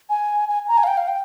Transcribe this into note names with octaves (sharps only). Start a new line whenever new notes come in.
G#5
G#5
A#5
G#5
F5
G5
F5
G5